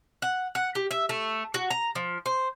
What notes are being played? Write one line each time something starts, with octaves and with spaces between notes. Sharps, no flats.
F#5
F#5
G4
E5
A3
F#4
A#5
F3
C5